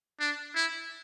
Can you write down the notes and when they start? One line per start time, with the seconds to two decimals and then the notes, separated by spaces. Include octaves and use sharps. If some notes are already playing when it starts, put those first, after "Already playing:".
0.20 D4
0.55 E4